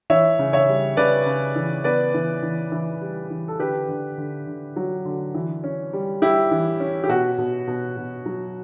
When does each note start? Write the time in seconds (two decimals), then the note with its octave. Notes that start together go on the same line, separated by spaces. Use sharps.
0.10 E3 C#5 E5
0.39 C#3
0.53 C#5 E5
0.68 G3
0.97 C#3 B4 D5
1.26 C#3
1.56 E3
1.84 B3 B4 D5
2.14 E3
2.43 E3
2.72 E3
3.01 G3
3.30 E3
3.48 A4
3.60 D3 G4 B4
3.89 D3
4.18 D3
4.47 D3
4.76 F#3
5.05 D3
5.35 E3
5.64 C#4
5.93 G3
6.22 G3 E4 G4
6.51 E3
6.80 C#4
7.04 G4
7.09 B2 F#4
7.38 B2
7.68 B2
7.97 B2
8.26 F#3